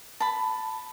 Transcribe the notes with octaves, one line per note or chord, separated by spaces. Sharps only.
A5 B5